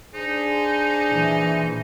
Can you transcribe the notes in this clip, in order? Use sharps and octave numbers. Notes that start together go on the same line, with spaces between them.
D4 D#4 G#4 C5
A#2 E3